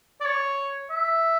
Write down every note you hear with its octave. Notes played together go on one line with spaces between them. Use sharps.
D5
C#5
E5